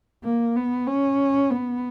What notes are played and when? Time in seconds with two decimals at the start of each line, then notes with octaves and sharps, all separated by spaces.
0.24 A#3
0.56 B3
0.87 C#4
1.50 B3